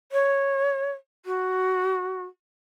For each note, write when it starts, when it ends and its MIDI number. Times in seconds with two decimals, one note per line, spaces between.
0.12 0.91 73
1.25 2.24 66